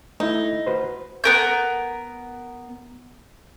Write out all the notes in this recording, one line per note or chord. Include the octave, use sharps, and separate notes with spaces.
A3 D#4 E4
F#4 B4 C5
B3 A#4 G6